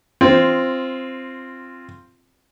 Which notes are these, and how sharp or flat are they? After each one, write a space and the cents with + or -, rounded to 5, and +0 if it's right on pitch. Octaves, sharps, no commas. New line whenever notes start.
C4 +5 F4 -10